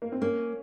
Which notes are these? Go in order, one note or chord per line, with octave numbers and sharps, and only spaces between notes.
A#3
C4
A#3 C#4